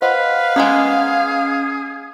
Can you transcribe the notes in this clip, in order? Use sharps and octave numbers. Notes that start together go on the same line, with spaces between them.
B4 C5 D#5 F5 F#5
G#3 A#3 B3 C#4 G#4